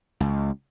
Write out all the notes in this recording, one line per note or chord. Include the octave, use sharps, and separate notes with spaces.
C#2